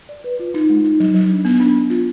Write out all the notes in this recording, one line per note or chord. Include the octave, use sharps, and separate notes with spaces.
D5
B4
F4
D#4
G#3
D#4
F#3
F#3
D4
B3
D4
B3
F4